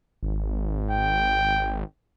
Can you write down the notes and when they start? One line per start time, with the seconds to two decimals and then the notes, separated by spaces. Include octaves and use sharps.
0.23 G#1
0.90 G5